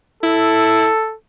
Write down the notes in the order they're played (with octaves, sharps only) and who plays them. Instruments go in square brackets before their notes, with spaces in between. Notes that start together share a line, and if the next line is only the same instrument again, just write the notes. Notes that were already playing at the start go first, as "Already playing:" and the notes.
[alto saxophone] E4 [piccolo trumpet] A4